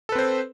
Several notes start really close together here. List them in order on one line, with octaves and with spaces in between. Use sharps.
A4 B4 C4 C5